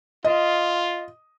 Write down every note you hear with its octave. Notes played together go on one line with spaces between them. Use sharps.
F4 D#5